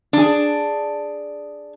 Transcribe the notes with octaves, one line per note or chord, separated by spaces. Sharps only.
D4 G#4